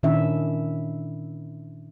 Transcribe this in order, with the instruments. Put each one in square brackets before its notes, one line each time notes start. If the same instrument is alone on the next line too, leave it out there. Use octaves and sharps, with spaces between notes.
[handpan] A#2 D#3 C#4 D4 E4 E5